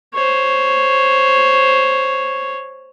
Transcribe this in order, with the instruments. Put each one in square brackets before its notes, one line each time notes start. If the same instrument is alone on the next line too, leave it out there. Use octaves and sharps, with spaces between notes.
[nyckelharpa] C5 C#5